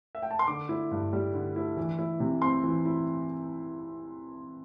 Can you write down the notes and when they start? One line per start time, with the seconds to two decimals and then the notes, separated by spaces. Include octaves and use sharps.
0.15 E5
0.22 G5
0.31 A5
0.39 C6
0.47 D3 D6
0.69 E4
0.91 G2
1.13 G3
1.34 D3
1.56 E4
1.77 E3
1.99 E4
2.20 C3
2.42 C4 C6
2.64 E3
2.86 E4